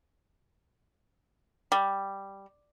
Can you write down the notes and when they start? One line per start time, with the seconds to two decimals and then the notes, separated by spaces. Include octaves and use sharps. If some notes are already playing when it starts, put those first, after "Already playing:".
1.72 G3